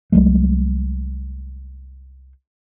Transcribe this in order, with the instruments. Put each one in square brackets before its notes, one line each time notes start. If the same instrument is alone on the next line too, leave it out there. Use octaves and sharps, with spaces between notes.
[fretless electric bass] C2 F#3 G#3 A3